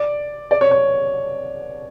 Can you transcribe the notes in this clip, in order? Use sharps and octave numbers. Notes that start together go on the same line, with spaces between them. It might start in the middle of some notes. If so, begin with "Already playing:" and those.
Already playing: D5
D5
C#5
C#5